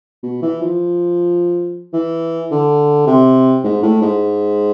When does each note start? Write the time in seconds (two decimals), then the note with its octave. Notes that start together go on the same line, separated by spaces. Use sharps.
0.23 B2
0.42 E3
0.62 F3
1.93 E3
2.51 D3
3.07 C3
3.64 G#2
3.83 A2
4.01 G#2